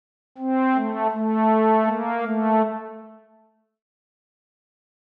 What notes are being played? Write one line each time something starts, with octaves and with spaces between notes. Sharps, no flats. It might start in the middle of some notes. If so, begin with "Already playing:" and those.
C4
A3
A3
A#3
A3